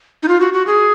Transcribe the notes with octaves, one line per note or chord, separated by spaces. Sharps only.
D#4
F4
F#4
F#4
G#4